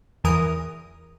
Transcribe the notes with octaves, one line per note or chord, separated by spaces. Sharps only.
E2 E3 A#4 D#6